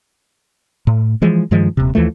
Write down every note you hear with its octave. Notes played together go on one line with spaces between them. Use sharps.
A2
E3 F3 G#3
G2 D#3 F3 G#3
D#1 C3
D#2 E3 F3 A3